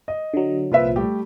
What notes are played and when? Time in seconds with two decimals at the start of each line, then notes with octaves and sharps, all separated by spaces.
0.08 D#5
0.34 D3 F#3
0.72 C2 A#2 F3 F4 B4 E5
0.96 G3 A3 G4